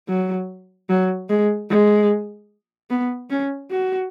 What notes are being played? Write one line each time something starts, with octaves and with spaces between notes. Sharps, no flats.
F#3
F#3
G#3
G#3
B3
C#4
F#4